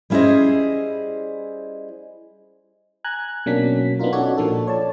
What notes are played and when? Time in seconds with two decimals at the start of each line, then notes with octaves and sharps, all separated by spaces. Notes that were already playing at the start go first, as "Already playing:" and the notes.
0.10 G3 C#4 E4 G#4 C5 D#5
3.04 G#5 A#5 F#6 G#6
3.46 B2 F#3 A#3 C#4 D4 B6
3.99 B3 D4 D#4 F4 A#4
4.12 C#4 D#4 F#4 A4 C#5 D5
4.38 A#2 F3 A#3 D4 A4
4.67 C#5 D5 A5